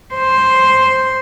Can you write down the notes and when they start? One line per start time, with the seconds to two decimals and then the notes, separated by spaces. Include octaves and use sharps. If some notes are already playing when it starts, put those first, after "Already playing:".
0.15 C5